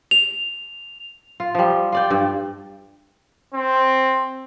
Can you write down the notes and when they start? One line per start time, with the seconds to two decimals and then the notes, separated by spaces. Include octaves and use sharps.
0.11 F7
1.40 F4
1.55 F3 G3
1.92 F4 D5 G5
2.10 G2
3.54 C4